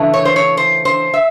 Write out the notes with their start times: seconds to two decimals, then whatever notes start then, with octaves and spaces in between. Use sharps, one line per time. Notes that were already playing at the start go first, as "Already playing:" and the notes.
Already playing: C#3 E3 A3 D4
0.14 C#5
0.25 C5
0.36 C#5
0.57 C5
0.85 C5
1.14 E5